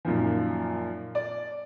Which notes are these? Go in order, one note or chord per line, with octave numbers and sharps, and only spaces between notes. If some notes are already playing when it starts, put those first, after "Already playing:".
F#2 A#2 D#3 F3
D5